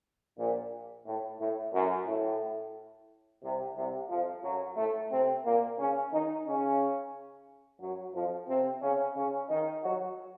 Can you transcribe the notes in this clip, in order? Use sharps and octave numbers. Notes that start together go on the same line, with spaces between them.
A#1 A#2
A2
A2
F#2
A2
C2 C3
C2 C3
F2 F3
F#2 F#3
A2 A3
C3 C4
A#2 A#3
C#3 C#4
D#3 D#4
C#3 C#4
F#2 F#3
F2 F3
C3 C4
C#3 C#4
C#3 C#4
D#3 D#4
F#3 F#4